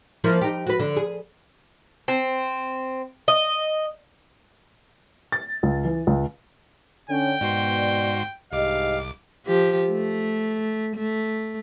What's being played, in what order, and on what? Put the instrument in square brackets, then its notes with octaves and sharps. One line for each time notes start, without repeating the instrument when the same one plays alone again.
[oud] F3 A#3 E4
D#4 G4
F#4 B4
D3
G#4
[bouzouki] C4
D#5
[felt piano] A6
C#2
E3
C#2
[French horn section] D3 C#4 [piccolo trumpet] G5
[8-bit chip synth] G#2 F#4 C6 [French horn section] B2 B3 D5
[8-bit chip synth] C2 D6 [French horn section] G#2 G4 D#5 [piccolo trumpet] F5
[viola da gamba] F3 G4
A3
A3